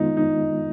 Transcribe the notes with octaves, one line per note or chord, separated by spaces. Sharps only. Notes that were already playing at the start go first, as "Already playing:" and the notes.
Already playing: D#3 G#3 B3 D#4 F4
D#4